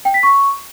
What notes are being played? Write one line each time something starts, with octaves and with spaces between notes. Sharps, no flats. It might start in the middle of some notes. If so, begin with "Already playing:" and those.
G5
B6
C#6